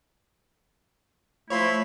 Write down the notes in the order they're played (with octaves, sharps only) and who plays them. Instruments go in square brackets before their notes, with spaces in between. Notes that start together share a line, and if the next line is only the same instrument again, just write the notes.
[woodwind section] F3 A3 E4 [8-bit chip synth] C#5 B5 C6